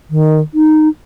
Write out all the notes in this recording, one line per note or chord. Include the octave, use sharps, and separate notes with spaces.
D#3
D#4